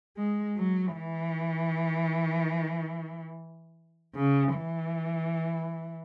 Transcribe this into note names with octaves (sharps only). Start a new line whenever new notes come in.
G#3
F#3
E3
C#3
E3